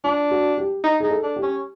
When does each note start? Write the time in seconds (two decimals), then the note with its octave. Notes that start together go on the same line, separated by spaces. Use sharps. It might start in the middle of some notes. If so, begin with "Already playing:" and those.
0.04 D4 F4
0.31 F#4
0.58 G4
0.84 D#4
1.00 D#4 G#4
1.11 A4
1.23 D4
1.36 G4
1.43 C#4